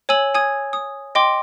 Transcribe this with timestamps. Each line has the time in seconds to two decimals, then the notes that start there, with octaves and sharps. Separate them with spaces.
0.09 C#5 G#5 E6 F#7
0.35 G#5 D#6 G#6
0.73 D#6
1.15 D#5 G5 C6 D6